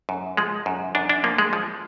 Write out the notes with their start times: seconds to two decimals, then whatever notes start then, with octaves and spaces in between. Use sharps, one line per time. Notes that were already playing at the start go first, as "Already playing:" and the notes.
0.09 F#2
0.37 F3 G#3
0.66 F#2
0.95 F#2 D4
1.09 D4
1.24 F3 A#3
1.38 G#3
1.53 F3